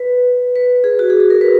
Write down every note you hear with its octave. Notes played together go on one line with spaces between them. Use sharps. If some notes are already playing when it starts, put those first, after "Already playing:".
Already playing: B4
B4
G#4
F#4
G#4
G#4
A#4
B4